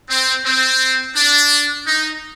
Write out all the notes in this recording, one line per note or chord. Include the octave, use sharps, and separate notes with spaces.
C4
C4
D4
D#4